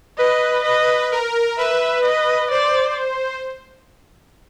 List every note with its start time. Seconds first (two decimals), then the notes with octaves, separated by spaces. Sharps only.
0.18 B4 D#5
0.64 B4 D#5
1.11 A#4
1.58 B4 E5
2.04 D#5
2.51 C5 D5